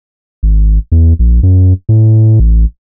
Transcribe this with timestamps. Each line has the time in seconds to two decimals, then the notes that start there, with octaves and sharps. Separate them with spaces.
0.43 G#1
0.92 E2
1.19 A#1
1.43 F#2
1.89 A2
2.40 A1